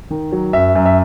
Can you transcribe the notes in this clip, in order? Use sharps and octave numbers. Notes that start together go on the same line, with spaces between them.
D#3
F#3
F#2 E5
F#2
E5